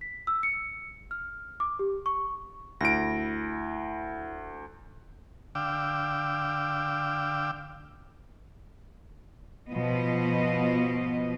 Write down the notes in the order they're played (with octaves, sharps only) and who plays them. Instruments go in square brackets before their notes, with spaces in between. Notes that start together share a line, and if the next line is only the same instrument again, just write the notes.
[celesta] B6
E6
C#7
F6
D6
G4
C#6
[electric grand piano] D2 D7 [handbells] E4 A#6
[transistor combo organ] D3 F5 G5 D6 E6
[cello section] B2 F3 B3 D#5